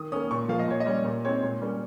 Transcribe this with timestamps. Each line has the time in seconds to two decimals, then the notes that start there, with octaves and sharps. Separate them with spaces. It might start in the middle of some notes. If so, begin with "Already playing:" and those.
Already playing: D#3 D#6
0.12 A#3 C#4 D#6
0.31 A#2 C#6
0.48 F3 A#3 F5
0.59 D#5
0.68 A#2 C#5
0.80 D#5
0.86 G3 C#4
1.05 A#2
1.24 G#3 C4 D#4 C#5
1.43 A#2
1.61 G3 A#3 C#4